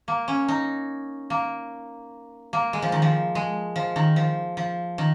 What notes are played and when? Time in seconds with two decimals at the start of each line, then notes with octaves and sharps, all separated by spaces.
0.08 A#3
0.28 C#4
0.48 D#4
1.30 A#3
2.53 A#3
2.73 G#3
2.82 F3
2.92 D#3
3.02 F3
3.35 G#3
3.76 F3
3.96 D#3
4.16 F3
4.57 F3
4.98 D#3